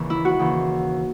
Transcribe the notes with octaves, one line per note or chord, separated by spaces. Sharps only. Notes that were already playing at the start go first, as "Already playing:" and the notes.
Already playing: D#2 C#3 E3
E4
F#4
D#2 C#3 E3